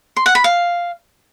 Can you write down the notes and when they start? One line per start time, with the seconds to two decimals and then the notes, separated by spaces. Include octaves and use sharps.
0.17 C6
0.26 F#5
0.35 B5
0.44 F5